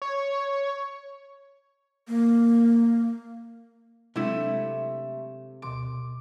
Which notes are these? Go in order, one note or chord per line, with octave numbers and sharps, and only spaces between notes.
C#5
A#3
C3 F#3 G#3 A3 D4 E4
D2 B2 C6 D6